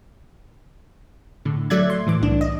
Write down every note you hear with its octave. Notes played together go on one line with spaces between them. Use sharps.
A2 D3
F#3 A3 D5 E5 F#6 G#6
C6
A2 E3 D6
C2 D4
D#5